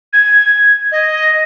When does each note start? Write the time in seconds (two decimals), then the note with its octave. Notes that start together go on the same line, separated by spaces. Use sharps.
0.13 G#6
0.92 D#5